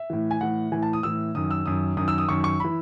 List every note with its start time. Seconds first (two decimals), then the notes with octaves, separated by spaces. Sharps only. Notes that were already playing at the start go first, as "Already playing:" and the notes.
Already playing: E5
0.10 A2 E3
0.31 G#5
0.41 A2 E3 F#5
0.72 A2 E3 G#5
0.82 A5
0.93 D#6
1.03 A2 E3 E6
1.35 F#2 D#3 D#6
1.51 E6
1.66 F#2 D#3 D#6
1.97 F#2 D#3 D#6
2.08 E6
2.18 D#6
2.28 F#2 D#3 C#6
2.44 C#6
2.60 E3 B5